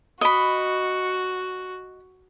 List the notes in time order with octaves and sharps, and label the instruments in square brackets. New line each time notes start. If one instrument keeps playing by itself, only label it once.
[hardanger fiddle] F#4 [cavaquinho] D#5 B5